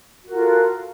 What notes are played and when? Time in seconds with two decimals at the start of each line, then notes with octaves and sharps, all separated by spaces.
0.24 F#4
0.28 A#4
0.33 F4
0.38 A4